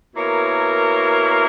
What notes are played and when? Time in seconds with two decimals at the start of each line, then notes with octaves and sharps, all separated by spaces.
0.14 B2 A#3 E4 A#4 C#5